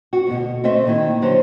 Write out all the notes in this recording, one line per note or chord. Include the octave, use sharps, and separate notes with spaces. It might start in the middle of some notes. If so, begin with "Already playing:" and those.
F#4
D2 B2
A3 C4 A4 D#5 E5
A#2 D#3 E4
D3 F#3 C5